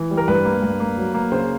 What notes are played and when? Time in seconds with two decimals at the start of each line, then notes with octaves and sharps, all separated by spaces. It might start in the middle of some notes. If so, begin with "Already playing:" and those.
Already playing: E3
0.11 G3
0.17 A#4
0.28 G2 B4
0.45 A#3
0.62 G2
0.80 A#3
0.98 F#3
1.14 A#3
1.32 C#3 C5